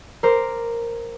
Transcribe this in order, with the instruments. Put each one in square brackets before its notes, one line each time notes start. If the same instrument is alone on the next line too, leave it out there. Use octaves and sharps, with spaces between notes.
[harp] A#4 C5 D6